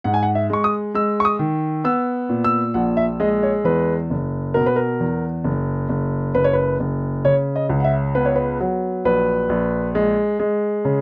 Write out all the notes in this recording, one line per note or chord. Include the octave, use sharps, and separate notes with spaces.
G#2 F#5
G#5
F#5
E5
G#3 C#6
D#6
G#3 E6
C#6
D#6
D#3
B3 E6
A#2
E6
A#1 F#5
E5
G#3 D#5
C#5
E2 B4
F#1
B2 A#4
B4
A#4
E2
F#1
F#1
F#1 B4
C#5
B4
F#1
C#3 C#5
D#5
C#2
F#5
E5
B3 B4
C#5
B4
F#3
A#1 B4
A#1
G#3
G#3
C#3